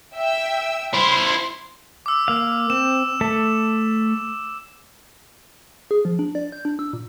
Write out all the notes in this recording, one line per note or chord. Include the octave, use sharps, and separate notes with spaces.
E5 G5 E6
E4 C5 C6
D6 E6
A#3 F5
C4 E7
A3 A4 E5
G#4
F3
D4
D5
G6
D4
E6
A#2